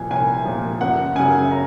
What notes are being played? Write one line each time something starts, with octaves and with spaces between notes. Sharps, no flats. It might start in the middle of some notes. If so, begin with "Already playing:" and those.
Already playing: C2 A#2 F3 G#5
C2 G#5
A#2 F3
F#1 F#5
F#2 C#3 G#5
A#5